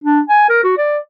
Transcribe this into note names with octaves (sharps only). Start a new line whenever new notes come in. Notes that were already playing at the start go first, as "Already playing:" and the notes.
D4
G#5
A#4
F#4
D5